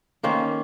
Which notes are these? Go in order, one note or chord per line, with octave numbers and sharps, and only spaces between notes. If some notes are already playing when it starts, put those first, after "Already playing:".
D#3 A#3 C#4 C5